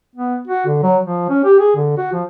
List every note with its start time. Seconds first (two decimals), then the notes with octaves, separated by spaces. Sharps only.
0.16 B3
0.47 F#4
0.67 D3
0.83 F#3
1.05 F3
1.30 C#4
1.44 G4
1.59 G#4
1.75 D3
1.97 F#4
2.13 F3